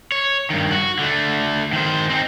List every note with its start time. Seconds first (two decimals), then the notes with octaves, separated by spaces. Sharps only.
0.12 C#5
0.50 G2 D#3
0.71 F#4
0.99 D3 A3
1.73 D#3 C5
2.10 C4 D#4